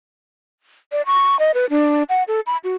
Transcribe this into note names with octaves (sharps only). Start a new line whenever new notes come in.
D5
C#6
D#5
B4
D4
F#5
A4
B5
F#4